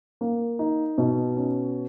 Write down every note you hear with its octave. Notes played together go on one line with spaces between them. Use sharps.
A#3
D#4
B2
C#4